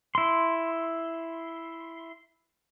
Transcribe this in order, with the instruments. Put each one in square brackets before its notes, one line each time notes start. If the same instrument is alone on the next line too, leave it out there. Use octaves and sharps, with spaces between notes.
[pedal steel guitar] E4 C6